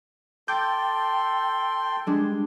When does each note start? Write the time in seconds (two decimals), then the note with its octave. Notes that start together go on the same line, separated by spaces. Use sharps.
0.48 A4 G5 C6 D6 A6
2.06 G3 G#3 D4